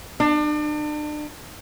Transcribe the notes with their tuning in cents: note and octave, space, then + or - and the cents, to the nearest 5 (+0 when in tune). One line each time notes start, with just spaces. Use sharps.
D4 +35